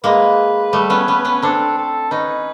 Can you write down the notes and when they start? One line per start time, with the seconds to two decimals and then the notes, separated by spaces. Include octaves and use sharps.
0.04 G#3 A#3 B4
0.73 G3 A3
0.90 B3 C#4
1.08 B3 C#4
1.25 B3 C#4
1.42 C4 D4 A4
1.77 A4
2.11 C#4 D#4 B4